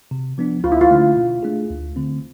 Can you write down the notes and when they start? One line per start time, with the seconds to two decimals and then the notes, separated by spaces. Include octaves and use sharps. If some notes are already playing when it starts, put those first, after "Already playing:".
0.11 C3
0.38 F3 B3 D4
0.64 D2 F4
0.72 E4
0.81 F4
0.91 D3 A3 D4
1.17 B2
1.43 A3 D4 G#4
1.70 D2
1.96 D3 A3 C4